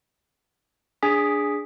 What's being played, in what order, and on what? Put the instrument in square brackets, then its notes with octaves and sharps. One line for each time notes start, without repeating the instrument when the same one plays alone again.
[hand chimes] D4 G#4 G#5 D#6 B6